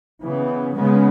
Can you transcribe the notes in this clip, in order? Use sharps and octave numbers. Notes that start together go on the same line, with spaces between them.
C#3 E3 B3
C#3 G#3 B3